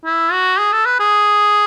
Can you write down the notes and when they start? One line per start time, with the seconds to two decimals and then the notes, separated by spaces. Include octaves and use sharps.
0.05 E4
0.32 F#4
0.59 G#4
0.73 A4
0.86 B4
1.00 G#4